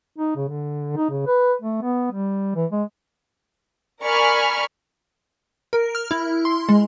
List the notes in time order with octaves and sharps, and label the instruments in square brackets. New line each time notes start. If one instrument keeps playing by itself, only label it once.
[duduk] D#4
C#3
D3
D#4
C#3
B4
A3
B3
G3
E3
G#3
[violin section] A#4 D5 G#5 B5 C#6 F6
[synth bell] A#4
F6
E4
C6
G#3